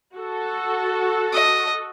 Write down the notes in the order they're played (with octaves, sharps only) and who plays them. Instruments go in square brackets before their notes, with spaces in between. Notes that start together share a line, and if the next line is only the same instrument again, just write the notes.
[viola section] F#4 A4
[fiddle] D#5